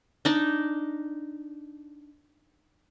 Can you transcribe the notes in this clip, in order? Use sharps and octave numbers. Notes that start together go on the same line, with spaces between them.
D4 D#4